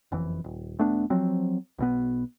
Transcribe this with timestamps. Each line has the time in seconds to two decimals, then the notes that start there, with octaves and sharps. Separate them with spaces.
0.12 F#1 F2 E3
0.44 D#1
0.79 E1 A3 B3 D4
1.10 F3 F#3 C4
1.78 B1 B2 B3